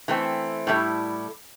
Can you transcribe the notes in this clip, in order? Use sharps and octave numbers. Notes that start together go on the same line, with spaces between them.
E3 A3 C4
A2 G3 E4 A4